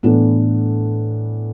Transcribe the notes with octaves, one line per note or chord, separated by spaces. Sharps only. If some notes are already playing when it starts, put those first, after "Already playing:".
A2 E3 B3 D4 A4